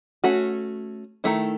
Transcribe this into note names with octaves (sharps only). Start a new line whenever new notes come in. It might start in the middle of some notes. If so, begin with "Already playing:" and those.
A3 C#4 F#4
D#3 A3 E4